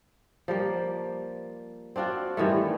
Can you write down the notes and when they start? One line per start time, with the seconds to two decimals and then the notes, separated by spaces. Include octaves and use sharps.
0.48 F3 G3 A#3
1.96 C4 D4 F4 F#4
2.37 G2 D#3 E3 A3